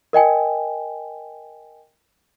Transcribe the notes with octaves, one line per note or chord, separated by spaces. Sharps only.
A#4 D#5 G5 G#5